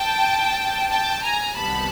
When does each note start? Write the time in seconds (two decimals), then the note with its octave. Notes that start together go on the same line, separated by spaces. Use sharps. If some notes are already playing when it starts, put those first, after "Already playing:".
Already playing: G5 A5
0.89 G5 A5
1.22 G#5 A#5
1.55 C2 C3 D#3 G3 B3 A5 B5